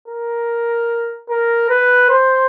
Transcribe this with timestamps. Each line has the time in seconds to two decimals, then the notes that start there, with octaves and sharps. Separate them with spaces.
0.08 A#4
1.29 A#4
1.69 B4
2.09 C5